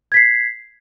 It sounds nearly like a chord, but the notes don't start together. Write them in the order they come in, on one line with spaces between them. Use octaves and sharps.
G#6 B6 C7